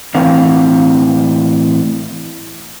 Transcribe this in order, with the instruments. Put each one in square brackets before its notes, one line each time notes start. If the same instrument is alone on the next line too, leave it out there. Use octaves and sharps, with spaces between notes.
[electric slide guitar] A2 E3 C4 A#4 F5 F#5